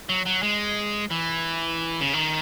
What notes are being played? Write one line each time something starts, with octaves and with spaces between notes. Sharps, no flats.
F#3
F#3
G#3
E3
C#3
D#3